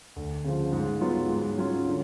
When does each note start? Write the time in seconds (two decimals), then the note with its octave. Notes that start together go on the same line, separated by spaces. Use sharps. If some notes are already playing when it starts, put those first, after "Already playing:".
0.16 D2
0.44 C#3 F3
0.72 G#2
1.01 F#3 B3 F4
1.29 G#2
1.58 F#3 C#4 F4
1.87 D3